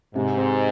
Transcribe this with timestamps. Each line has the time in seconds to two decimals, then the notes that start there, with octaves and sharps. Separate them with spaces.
0.15 G#2 C3
0.37 C4